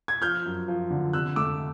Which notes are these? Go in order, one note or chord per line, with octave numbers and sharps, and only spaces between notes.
G#6
F3 F6 G6
F#2
F3
D3
C3 E6 F#6
A3 D6 E6